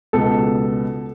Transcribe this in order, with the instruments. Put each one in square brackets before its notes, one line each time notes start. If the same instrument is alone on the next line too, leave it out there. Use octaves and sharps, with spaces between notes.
[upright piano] C#2 B2 A4